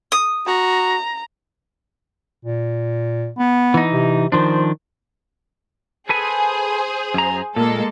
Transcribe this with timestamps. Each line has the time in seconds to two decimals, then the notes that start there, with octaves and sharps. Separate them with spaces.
0.12 D#6
0.47 F#4 A#5
2.45 A#2
3.38 B3
3.74 E3 D#4
3.92 C3
4.32 D#3 F3 D4 C5
6.09 G#4 A4 B4 C5 G#5
7.14 F#2 A#5
7.56 A#2 G#3 A#3 A4